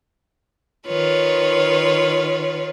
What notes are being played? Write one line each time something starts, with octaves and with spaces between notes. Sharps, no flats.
D#3 F4 B4 C#5